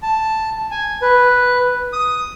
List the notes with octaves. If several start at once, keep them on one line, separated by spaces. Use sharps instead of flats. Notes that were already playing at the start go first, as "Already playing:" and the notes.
A5
G#5
B4
D#6